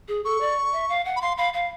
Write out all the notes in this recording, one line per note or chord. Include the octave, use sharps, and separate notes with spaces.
G#4
A4 C#6
D5
E5
F5
F#5
B5
F5 C6
F5 B5
F5